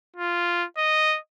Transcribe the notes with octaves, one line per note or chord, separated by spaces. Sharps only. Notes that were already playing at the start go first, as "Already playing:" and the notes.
F4
D#5